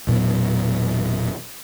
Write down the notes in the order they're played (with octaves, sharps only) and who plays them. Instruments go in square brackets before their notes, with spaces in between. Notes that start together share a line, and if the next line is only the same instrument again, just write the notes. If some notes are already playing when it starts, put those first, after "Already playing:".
[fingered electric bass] E1 A#2 F#3 B3